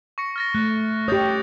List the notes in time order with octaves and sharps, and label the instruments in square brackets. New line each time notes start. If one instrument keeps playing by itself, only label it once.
[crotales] C#6 A#6 C#7
F6 A6 A#6
[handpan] A3 [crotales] F#6
[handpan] G4 C#5 [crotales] D#6 G6 A6